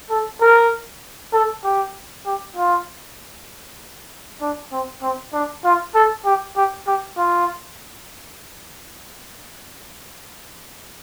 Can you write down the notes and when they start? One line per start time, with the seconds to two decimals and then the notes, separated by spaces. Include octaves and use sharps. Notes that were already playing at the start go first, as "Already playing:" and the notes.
0.10 A4
0.41 A#4
1.33 A4
1.64 G4
2.26 G4
2.56 F4
4.41 D4
4.72 C4
5.02 C4
5.33 D4
5.64 F4
5.95 A4
6.25 G4
6.57 G4
6.87 G4
7.17 F4